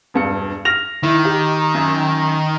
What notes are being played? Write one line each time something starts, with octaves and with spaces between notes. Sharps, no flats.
E1 G2 C#7
F6 A#6 F7
D#3 E4
G4
F#2